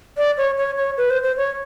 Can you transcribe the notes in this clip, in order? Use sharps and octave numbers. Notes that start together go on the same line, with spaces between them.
D5
C#5
C#5
C#5
B4
C5
C5
C#5